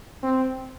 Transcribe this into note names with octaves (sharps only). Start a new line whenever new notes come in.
C4